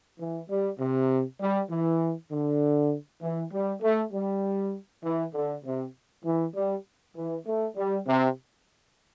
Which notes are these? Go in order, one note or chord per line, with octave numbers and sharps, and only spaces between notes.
E3
G3
C3
G3
E3
D3
E3
G3
A3
G3
E3
D3
C3
E3
G3
E3
A3
G3
C3